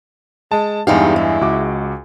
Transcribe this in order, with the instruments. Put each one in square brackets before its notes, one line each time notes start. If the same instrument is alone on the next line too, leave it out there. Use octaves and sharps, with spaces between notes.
[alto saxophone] G#3 [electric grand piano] A5
[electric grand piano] E2 G2 F5 [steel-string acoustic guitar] G#3 D#4 G4 [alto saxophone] E4
[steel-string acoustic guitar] G#3
[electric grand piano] C#2 F#4 D6